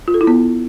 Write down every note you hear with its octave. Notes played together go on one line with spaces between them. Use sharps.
F4
A4
E4
B3